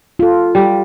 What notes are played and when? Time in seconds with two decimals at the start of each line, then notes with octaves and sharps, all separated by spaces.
0.19 F4 A4
0.55 G3